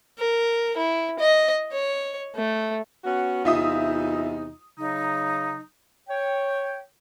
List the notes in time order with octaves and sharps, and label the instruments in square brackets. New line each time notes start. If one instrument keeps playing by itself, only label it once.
[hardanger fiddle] A#4
E4
D#5
C#5
A3
[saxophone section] B3 C#4 F#4
[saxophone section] E2 C3 D#4 [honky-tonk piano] F4 E5 D#6
[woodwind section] C#3 F#3 D#4
C#5 G5